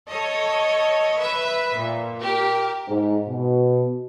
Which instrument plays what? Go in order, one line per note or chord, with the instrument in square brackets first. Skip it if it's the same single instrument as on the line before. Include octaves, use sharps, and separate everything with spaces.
[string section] A4 C#5 D#5
B4 E5
A#2
G4 A#4
[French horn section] G#2
B2